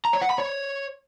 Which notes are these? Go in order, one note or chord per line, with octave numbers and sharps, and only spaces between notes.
A#5
C#5
F#5
B5
C#5